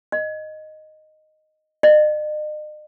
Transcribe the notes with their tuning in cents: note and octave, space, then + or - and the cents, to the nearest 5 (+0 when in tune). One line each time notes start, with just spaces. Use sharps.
D#5 -5
D#5 -45